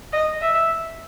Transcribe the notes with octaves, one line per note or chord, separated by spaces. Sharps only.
D#5
E5